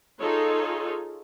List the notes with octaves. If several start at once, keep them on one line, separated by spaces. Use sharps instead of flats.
D#4 F4 G#4 A4 C#5